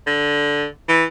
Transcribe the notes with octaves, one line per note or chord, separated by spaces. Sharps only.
D3
E3